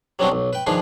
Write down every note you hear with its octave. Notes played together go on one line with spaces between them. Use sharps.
F#3 G3 B3 C4 D4 F#4
B1
B4 G5
D#3 F3 D4 D#4 G#4 B4